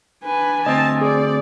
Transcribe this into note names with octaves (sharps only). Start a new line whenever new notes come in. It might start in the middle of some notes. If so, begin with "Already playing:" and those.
D4 B4 G#5
D2 C4 D#5 A5
G#4 D5